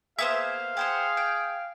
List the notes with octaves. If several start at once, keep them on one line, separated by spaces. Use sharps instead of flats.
A#3 B3 G#4 C5 E5 F5
G4 G#4 C5 F#5
G5